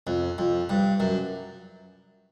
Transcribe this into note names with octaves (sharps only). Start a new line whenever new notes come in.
F2
F2
G2
F#2